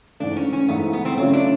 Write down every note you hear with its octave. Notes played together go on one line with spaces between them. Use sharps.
G#2 E3 A3 D4
C#4
C#4
G#2 E3 A3 B3
B3
C4
C#3 F#3 A3 C4 C#4 F4
D4